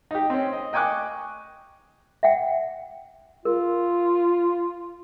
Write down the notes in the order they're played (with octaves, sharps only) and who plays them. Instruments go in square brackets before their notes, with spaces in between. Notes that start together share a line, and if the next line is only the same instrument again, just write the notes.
[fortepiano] D#4 G4
C4 C#4
D#5
D#5 G5 G#5 C#6 D6 F#6
[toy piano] E5 F#5 G5
[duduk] F4 [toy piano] A#4